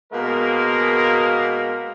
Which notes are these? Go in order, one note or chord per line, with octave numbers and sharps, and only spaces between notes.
B2 G#3 A#3 B3 A#4